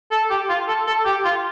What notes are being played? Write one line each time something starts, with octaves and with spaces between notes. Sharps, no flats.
A4
G4
F4
A4
A4
G4
F4